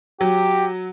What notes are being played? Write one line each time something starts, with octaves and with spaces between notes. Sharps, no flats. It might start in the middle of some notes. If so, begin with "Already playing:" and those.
F#3 G4